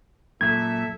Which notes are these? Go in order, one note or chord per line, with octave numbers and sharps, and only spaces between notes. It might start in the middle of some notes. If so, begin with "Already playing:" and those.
F#2 A#2 A4 E5 G#6